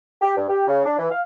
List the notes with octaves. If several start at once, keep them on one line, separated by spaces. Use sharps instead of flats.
G4
G2
G4
C#3
D4
E3
F5